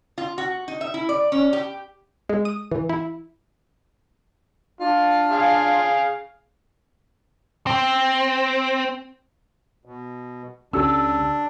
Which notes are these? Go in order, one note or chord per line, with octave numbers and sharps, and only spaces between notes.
F4
F#4
D#4
E5
E4
D5
C#4
G4
G#3
D#6
E3
E4
D4 F4
G#4 F5
C4
B2
C#2 C#4 D4 G4 A4 E6